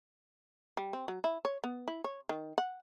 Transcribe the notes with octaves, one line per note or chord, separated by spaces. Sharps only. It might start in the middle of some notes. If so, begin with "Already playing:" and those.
G3
C4
F#3
E4
C#5
B3
E4
C#5
D#3
F#5